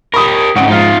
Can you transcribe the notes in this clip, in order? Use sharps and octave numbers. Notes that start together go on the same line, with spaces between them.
G4 A#4 B5 D#6
G#2 C#3 C4 F#5 D#6 D7
G#2 F3 D#4 F4 F6